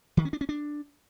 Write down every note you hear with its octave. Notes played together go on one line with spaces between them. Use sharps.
D#3
C#4
D4
C#4
D4